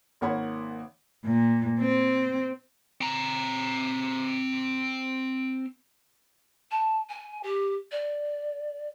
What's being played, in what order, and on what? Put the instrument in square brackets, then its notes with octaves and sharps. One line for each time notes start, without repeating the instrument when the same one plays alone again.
[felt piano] G#1 A#3 C#5 F#5 B5 G#6
[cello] A#2
C4
[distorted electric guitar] C4 A#5
[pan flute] A5
G#5
G4
D5